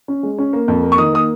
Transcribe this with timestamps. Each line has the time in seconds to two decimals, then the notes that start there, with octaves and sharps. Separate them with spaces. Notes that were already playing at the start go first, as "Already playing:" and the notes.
0.08 C#4
0.23 G#3
0.38 C#4
0.53 A#3
0.68 F2
0.83 A#3
0.92 C#6
0.98 D#3 D#6
1.13 A#3 D#6